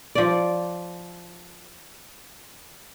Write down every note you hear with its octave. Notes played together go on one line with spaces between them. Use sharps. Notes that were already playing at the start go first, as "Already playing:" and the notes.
F3 D5